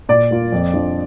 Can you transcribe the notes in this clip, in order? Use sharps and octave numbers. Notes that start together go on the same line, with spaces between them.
A#2 D5
A#3 F4
F2
F3 D4